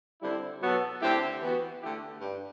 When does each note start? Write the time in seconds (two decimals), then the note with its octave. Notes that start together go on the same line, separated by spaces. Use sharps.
0.22 D3 G3 C4 E4
0.62 B2 F#3 B3 F#4 A4
1.02 D3 A3 C4 E4 G4
1.42 E3 B3 F#4
1.81 D3 A3 E4 G4
2.21 G2